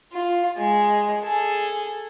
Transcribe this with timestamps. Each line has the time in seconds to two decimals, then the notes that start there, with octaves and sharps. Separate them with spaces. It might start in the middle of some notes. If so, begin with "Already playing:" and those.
0.13 F4
0.58 G#3
1.23 G#4 A4